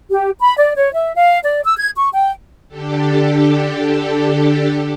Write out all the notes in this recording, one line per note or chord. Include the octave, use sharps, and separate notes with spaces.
G4
B5
D5
C#5
E5
F5
D5
E6
G#6
C#6
G5
D3 D4 G4 A4